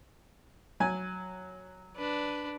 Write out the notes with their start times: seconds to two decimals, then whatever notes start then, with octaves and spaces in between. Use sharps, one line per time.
0.80 F#3 G#5
1.96 D4 B4